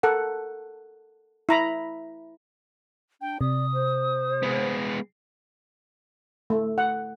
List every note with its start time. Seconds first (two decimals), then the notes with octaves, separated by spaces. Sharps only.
0.03 A4 A#4 F#5
1.49 E4 A#5 B5
3.21 D4 G5
3.41 C3 D5 D#6
3.73 C5
4.43 G#3 B3
6.50 A3
6.78 F#5